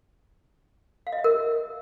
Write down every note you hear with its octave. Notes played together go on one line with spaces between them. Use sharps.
F5
D#5
E5
A#4